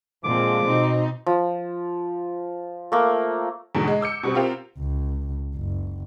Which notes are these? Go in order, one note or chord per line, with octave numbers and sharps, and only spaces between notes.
A#2 D3 F3 G#3 C4 D6
B2 C4 D#4
F3
A3 A#3
E2 G#2 B2 D3
G#3
D6 E6 G6 C#7
B2 G3 C4
C4 F4 G4 A#4 C5
C#2
F#1